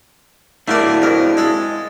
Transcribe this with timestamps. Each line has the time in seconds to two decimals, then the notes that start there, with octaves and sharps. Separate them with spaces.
0.68 A3 A#3 D4 E4 F#4 D5
1.02 F2 A#4
1.37 G#3 A4